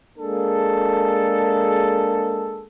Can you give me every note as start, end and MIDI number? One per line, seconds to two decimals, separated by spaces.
0.18 2.68 56
0.18 2.68 58
0.18 2.68 62
0.18 2.68 68
0.18 2.68 69